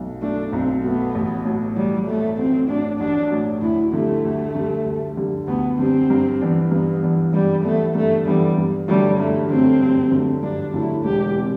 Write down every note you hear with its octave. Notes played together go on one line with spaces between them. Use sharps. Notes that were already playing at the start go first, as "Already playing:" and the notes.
Already playing: B1 B2 A3
B2 A3 D4
B1 C4
B2 A3 B3
A1
A2 F#3
A1 G3
A2 F#3 A3
A1 C4
A2 F#3 D4
A1 D4
A2 F#3
D2 E4
D3 G3 A3
D2
D3 G3
D2
D3 G3
D2 B3
D3 G3 C4
G2
E3 B3 D4
G2 B3
E3 B3 D4
G2 G3
E3 A3 B3 D4
G2 A3
E3 G3 B3 D4
G2
D3 F#3 G3 A3
G2 A3
D3 F#3 A3 C4
G2
D3 F#3 A3
G2 D4
D3 F#3 A3 E4
E1 G4
C3